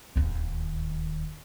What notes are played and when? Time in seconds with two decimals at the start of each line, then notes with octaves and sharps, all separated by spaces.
0.16 D1 D#2